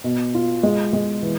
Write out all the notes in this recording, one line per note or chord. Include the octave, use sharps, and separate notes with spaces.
B2
F4
G#3
G#3
E3